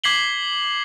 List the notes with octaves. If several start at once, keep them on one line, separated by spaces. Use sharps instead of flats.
D6 G#6 B6 C7 F#7 G7